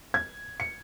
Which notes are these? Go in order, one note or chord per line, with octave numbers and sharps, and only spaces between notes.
G#6
C#7